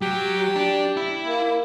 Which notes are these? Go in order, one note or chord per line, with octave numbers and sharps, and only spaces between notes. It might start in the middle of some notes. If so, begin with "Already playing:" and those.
F#3 G4
D4
E4
A#3